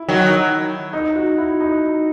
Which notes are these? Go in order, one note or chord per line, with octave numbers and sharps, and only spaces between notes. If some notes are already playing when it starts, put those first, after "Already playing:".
Already playing: E4
D#3 F#3
D#4
F#4
E4
D#4